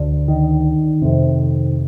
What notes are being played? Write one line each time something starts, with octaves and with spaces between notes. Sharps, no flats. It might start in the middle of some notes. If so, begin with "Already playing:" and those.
Already playing: D2 D3
D#3
F2 C3